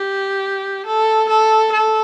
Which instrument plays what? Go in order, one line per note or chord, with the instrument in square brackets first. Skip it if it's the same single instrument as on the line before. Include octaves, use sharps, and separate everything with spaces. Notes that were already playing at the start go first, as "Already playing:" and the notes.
Already playing: [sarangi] G4
A4
A4
A4